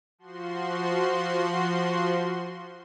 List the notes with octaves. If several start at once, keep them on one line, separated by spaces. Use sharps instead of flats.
F3 F#4 C6